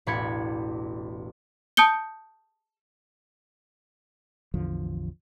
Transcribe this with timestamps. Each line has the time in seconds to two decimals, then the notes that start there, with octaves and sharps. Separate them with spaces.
0.07 E1 A1 D5 B5 G#6 C#7
1.77 A5 D#6 G6 C#7 G7
4.54 A1 E2 D3 F3